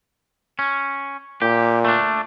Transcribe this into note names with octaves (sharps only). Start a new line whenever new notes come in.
C#4
A#2 G4
A3 D4